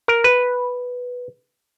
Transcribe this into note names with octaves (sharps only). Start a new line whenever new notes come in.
A#4
B4